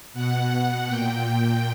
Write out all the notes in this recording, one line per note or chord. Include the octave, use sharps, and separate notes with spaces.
B2 F#5
A#2 G5